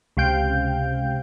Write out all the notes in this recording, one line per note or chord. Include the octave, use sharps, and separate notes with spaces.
C#2 C3 F5 G5 G6